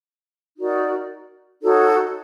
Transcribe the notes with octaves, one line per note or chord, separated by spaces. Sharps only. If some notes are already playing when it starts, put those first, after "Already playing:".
D#4 F#4 A#4 D5
D#4 F#4 A4 C#5